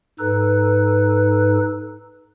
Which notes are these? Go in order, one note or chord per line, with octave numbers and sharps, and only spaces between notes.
G#2 D#4 A4 B4